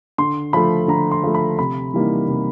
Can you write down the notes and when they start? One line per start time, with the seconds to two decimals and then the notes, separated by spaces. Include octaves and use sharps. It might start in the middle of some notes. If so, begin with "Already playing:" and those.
0.18 D3 C6
0.53 F3 A3 B5
0.88 D3 A#5
1.11 C6
1.23 F3 A3
1.34 B5
1.59 C3 B5
1.94 E3 G3 A#3 D#4
2.28 C3